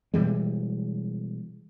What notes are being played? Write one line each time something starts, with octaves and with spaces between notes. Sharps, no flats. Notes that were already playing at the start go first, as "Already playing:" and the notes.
B2 E3 G3 G#3